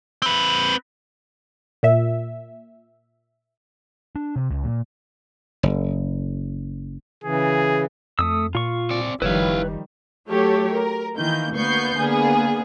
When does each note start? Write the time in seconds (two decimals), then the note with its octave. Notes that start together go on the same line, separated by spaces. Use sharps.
0.22 C4 B4
1.83 A#2 E5
4.16 D4
4.36 C3
4.51 C#2
4.64 A#2
5.63 F#1
7.24 C#3 E3 G#4
8.19 F2 A3 D#6 E6
8.55 A#2 F4 C#6
8.90 C4 D5
9.22 F#1 D#3 F3 G3 E4 B4 C#5 F5
10.29 F#3 A3 G4 A4 C#5
10.72 A#4
11.17 D#3 E3 A#3 G6
11.53 D2 A#3 B3 C#6 G6 C7
11.97 D3 A#3 B3 G#4